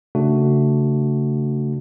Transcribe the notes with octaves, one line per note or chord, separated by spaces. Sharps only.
C#3 A3 D4 F#4